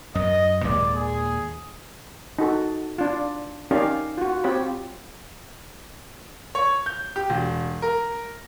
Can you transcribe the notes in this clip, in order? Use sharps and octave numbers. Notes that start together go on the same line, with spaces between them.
F#2 D#5
D#2 A#2 G#3 D5
G#4
D#4 F#4 A4
D4 F4
C#4 D#4 G4 A#4 D5 F5
F4 F#4
C4 F4 G4 C#5 B5
C#5
G6
G4
E1
A#4